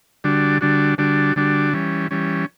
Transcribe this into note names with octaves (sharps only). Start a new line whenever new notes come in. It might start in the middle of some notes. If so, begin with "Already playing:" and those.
D3 G3 D4 F#4
D3 G3 D4 F#4
D3 G3 D4 F#4
D3 G3 D4 F#4
E3 G3 C#4
E3 G3 C#4